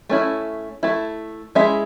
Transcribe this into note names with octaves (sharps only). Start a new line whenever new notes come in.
A3 C#4 E4
A3 E4
G#3 C#4 E4 E5